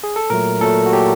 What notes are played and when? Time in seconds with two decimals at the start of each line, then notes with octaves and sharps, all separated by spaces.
0.04 G#4
0.16 A4
0.30 A#2 F#3 A3 A#4
0.61 A#2 F#3 A3 A4
0.86 F#4
0.93 A#2 F#3 A3 G4